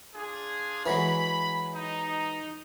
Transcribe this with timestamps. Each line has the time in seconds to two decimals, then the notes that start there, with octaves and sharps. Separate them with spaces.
0.14 D4 F4 G#4
0.86 E3 F#3 G#3 B5
1.74 D#4